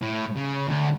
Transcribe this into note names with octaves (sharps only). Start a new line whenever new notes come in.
A2
C#3
D2